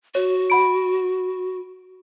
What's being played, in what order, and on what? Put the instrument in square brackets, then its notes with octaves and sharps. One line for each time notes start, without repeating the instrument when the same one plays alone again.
[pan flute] F#4 [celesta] C#5
[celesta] F#5 B5 D7